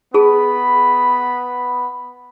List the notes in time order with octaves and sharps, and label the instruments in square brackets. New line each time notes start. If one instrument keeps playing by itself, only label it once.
[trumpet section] B3 B5 [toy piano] G#4 A5